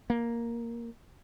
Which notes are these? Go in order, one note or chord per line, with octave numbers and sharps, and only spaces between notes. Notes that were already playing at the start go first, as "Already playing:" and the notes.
A#3